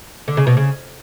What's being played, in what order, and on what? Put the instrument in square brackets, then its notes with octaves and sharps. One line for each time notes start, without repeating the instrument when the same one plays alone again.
[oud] D3
C#3
B2
C#3